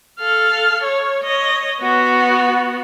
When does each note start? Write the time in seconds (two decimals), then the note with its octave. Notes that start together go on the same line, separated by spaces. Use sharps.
0.20 A4 F5
0.84 C#5
1.24 C#5 D#5
1.80 B3 F#4